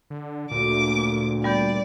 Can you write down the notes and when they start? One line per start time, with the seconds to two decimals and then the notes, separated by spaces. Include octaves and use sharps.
0.10 D3
0.51 D2 A#2 D6
1.44 G3 B3 D5 G6